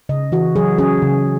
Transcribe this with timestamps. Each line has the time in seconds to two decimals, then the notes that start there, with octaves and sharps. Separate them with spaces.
0.09 C#3 D#5
0.32 E3 F#4
0.56 F#3 G#4
0.78 C#4 G#4
1.02 C#3